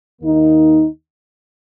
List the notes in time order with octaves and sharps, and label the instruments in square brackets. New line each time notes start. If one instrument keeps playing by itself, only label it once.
[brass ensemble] D#2 D#3 A#3 D#4